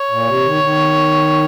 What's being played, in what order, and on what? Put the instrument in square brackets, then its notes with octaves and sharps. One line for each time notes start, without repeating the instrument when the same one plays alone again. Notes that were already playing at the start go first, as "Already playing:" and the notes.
Already playing: [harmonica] C#5
[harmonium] A#2
C3
D#3
D#3